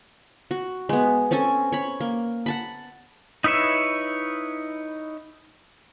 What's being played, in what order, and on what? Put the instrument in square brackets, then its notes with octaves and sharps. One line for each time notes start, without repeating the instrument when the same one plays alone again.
[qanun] F#4
G#3 B3
C4 C#4 A4 G#5
C#5 B5
A#3
F#5 A5 B5
[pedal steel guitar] D#4 E4 B4 C#5 E5